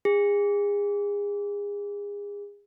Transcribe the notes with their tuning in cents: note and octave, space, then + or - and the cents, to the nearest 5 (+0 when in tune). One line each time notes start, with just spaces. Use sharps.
G#4 -30